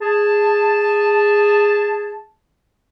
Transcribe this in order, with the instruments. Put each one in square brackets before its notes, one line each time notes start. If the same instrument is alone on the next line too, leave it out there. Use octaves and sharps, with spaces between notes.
[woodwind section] G#4 A5